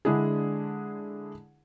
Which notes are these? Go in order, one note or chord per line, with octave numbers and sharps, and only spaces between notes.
D3 G#3 D4 E4 G#4